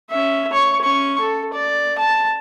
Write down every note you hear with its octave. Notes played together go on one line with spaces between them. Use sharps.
C#4 E5
C#5 C#6
C#4 C#6
A4
D5
A5